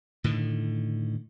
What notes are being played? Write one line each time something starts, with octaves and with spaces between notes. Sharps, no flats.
A2 D3 D#3